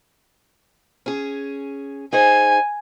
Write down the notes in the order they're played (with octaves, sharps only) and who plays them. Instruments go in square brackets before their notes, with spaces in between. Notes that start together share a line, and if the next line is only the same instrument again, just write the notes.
[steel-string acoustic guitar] C#4 G#4
[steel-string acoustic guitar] D#4 G#4 C5 [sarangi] G#5